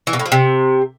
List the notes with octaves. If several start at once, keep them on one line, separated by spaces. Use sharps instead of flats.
E3
B2
A2
F3
C3